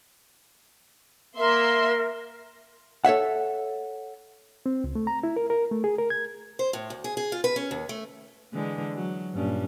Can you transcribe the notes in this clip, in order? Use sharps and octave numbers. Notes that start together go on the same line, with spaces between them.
A#3 A#4 E5 C6
A4 C#5 E5 F#5
C4
C#2
A3
A#5
E4
A#4
A#4
A3
G#4
A#4
G#6
C5
A2
D2
G#4
G#4
F4
B4
C#4
D#2
A3
D3 E3 G#3
F#3
G2 A#2 C#4